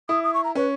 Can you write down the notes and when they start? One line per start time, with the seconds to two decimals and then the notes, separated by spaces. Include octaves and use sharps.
0.09 E4 D#6
0.24 D#6
0.34 C#6
0.44 A#5
0.55 C#4 B4